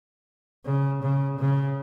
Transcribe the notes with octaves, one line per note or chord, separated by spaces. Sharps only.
C#3
C#3
C#3